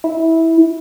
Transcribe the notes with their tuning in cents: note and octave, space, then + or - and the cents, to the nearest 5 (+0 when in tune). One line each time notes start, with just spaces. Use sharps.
E4 -15